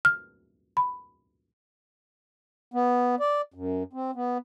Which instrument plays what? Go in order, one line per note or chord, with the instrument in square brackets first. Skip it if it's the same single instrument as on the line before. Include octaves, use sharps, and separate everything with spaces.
[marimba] F6
B5
[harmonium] B3
D5
F#2
C4
B3